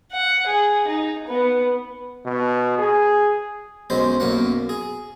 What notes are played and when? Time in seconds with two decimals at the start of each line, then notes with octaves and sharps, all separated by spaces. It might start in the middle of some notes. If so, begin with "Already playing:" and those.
0.12 F#5
0.47 G#4
0.88 D#4
1.27 B3
2.26 B2
2.79 G#4
3.90 B1 F#2 G#3 C5 B5
4.20 B1 F#2 A#3 F#5
4.69 G#4